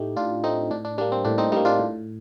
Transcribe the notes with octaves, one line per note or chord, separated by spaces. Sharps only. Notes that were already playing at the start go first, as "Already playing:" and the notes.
Already playing: A2 A3 D#4 G4
A2 D4 F4
A3 C4 D#4
A2 D4
D4
G3 A#3 D4
C4
A2 D4
C4 D#4
G3 A#3 C4 D#4
D4 F4
A2